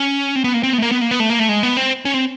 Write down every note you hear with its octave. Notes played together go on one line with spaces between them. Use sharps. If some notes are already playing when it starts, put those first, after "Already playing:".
Already playing: C#4
C4
B3
A#3
C4
B3
A3
A#3
B3
A#3
B3
A3
A#3
A3
G#3
B3
C4
C#4
C4